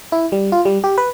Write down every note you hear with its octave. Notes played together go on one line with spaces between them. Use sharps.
E4
G3
F4
G3
G4
B4